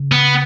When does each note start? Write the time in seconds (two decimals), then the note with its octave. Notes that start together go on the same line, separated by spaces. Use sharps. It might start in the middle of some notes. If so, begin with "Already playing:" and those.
Already playing: C#3
0.12 B3